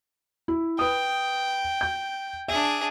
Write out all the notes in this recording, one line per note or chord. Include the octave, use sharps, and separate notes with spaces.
E4
B4 G5 D#6
G6
D4 G#4 E5